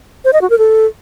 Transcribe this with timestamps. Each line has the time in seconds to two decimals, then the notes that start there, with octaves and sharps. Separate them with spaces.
0.25 C5
0.33 D#5
0.42 F#4
0.50 A#4
0.58 A4